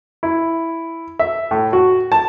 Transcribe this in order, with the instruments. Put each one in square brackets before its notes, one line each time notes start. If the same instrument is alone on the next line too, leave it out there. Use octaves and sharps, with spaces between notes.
[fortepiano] E4
E5
A2
F#4
A5